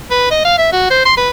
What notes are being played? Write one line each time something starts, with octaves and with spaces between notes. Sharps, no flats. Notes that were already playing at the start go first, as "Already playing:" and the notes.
B4
D#5
F5
E5
F#4
C5
C6
B4